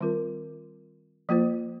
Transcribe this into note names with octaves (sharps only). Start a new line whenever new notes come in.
D#3 G3 C4 F4 A#4
F3 A#3 F4 C5